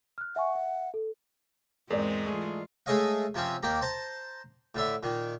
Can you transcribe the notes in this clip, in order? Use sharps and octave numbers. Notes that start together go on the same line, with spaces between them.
F6 F#6
E5 F#5 G#5 C#6
E5
A4
E2 G#2 G#3 C4 A#4 D5
E3 A3 F4 G#4
G#3 A3 G#4 C#5 D#5 F5
C3 F3 C4 C#4
D#2 A#3 G4 A#5
C5 A5 A#5
A2 D3 E5
A#2 D#3